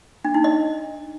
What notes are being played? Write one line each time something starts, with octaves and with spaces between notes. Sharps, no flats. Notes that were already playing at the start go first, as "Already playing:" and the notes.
D4
D#4
D#5